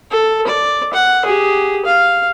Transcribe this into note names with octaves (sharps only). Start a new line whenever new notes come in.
A4
D5
F#5
G4 G#4
F5